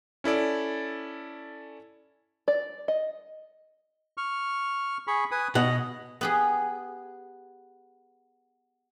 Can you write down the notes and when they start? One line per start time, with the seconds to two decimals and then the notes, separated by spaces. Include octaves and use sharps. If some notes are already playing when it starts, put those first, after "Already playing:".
0.24 C#4 E4 A4 D5
2.48 D5
2.88 D#5
4.17 C#6 F6
5.07 G#4 B5 C#6
5.31 B4 G#5 D#6
5.55 B2 D#5 F#5
6.21 B3 G4 G#4